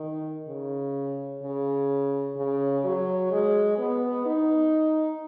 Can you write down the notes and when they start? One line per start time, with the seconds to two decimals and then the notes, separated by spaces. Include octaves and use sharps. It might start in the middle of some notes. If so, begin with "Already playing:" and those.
Already playing: D#3
0.48 C#3
1.43 C#3
2.37 C#3
2.84 F#3
3.32 G#3
3.78 B3
4.26 D#4